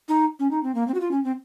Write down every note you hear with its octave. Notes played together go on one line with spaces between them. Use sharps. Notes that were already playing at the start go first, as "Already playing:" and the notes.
D#4
C#4
D#4
C4
A#3
C4
F#4
F4
C#4
C4